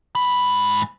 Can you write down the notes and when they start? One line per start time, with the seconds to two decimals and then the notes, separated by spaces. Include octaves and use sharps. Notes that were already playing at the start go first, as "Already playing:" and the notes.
0.15 G#2 B5